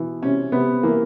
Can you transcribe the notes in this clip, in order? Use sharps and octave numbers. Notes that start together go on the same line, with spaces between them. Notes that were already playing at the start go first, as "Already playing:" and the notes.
Already playing: B2 E3
C3 C#4
C3 B3
E3 A#3